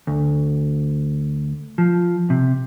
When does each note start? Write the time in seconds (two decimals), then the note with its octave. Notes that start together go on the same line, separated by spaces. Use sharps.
0.07 D2
1.78 F3
2.30 C3